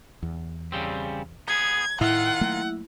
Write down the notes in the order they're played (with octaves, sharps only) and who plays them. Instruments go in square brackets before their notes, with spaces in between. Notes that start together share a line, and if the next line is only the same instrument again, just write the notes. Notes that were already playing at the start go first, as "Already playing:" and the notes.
[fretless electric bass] E2
[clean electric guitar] C#3 G3 C4
[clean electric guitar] B3 G#4 [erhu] G#6
[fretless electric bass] A2 [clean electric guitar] D#3 F4 [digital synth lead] E4 [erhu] F#5
[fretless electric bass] F#3 A3 A#3